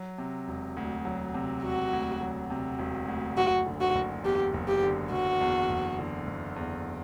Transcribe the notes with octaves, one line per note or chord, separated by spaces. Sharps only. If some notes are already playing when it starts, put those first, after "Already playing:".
Already playing: F#3
C3
E1
D2
F#3
C3
E1 F#4
D2
F#3
C3
E1
D2
F#1 F#4
D3
F#4
F#1
E2 G4
F#1
G4
D3
F#1 F#4
E2
F#1
D3
F#1
E2